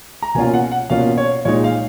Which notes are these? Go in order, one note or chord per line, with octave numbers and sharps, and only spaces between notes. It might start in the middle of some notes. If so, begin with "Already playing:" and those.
A#5
B2 A#3 C#4 F4 G#5
F#5
F#5
B2 A#3 C#4 F4 F5
C#5
A#2 G#3 D#4 C#5
F5